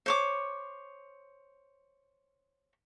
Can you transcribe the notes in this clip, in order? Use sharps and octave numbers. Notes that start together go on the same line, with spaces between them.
C5 C#5 D6